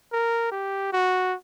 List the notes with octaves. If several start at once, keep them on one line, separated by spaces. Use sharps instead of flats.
A#4
G4
F#4